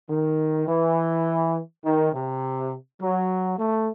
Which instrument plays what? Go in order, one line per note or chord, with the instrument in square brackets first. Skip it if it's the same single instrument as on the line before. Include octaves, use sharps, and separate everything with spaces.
[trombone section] D#3
E3
D#3
C3
F#3
A3